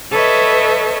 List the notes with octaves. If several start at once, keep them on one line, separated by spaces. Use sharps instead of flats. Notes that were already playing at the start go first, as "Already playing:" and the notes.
A4 B4 C#5 D#5 E5